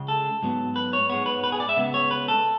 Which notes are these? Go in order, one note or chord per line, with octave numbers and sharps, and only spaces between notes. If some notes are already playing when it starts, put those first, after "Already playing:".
Already playing: C#2 C#3 G#3
A4
G#2 F#3 B3
B4
C#5
G#2 G#3 B3 C#5
B4
B4
G#4
D5
E5
C#2 C#3 G#3 B3
C#5
B4
A4